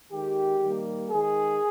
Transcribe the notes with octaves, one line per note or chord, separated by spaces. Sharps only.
D#3 G#3 G4
D#3 G3 A#3
D#3 G#3 G#4